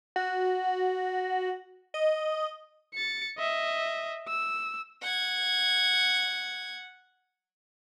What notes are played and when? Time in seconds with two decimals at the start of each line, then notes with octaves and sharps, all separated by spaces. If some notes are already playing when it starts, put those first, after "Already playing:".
0.16 F#4
1.94 D#5
2.94 A6 C#7
3.38 D#5 E5
4.28 E6
5.02 F#5 G#6